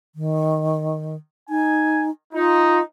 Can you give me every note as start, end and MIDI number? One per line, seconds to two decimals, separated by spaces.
0.16 1.16 51
1.50 2.10 63
1.50 2.02 80
2.33 2.77 63
2.33 2.81 65